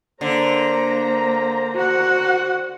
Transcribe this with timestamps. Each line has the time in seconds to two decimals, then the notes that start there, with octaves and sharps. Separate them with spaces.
0.21 D3 A#3 C5 A#5
1.75 F#4 F#5